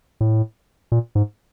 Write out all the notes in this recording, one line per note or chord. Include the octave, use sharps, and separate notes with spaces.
A2
A#2
G#2